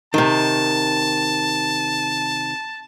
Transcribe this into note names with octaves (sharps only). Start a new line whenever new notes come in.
C3 D#3 A5